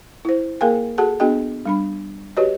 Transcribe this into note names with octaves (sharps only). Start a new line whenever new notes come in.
E4 C5
A#3 G#4 A#4 F5 G5 G#5
F#4 G#4 A4 F#5 A5
B3 D4 F#4 G#4 D#5 G5
G3 D4 B5
F#4 G4 B4 C#5 D#5